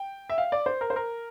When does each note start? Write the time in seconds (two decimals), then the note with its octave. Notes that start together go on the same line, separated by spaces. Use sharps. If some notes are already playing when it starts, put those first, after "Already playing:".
Already playing: G5
0.30 E5
0.38 F5
0.52 D5
0.66 C5
0.81 A#4
0.90 C5
0.96 A#4